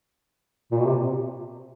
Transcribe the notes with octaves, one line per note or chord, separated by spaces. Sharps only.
A#2
B2
C3